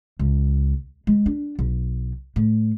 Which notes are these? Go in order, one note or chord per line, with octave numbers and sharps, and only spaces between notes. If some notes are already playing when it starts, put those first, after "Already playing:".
C#2
G#3
D4
B1
A2